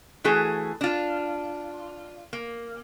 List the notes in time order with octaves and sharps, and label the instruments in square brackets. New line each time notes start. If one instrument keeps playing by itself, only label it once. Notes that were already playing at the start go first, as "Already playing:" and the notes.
[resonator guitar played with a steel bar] E3 A3 F#4 G#4
D4 F4
A#3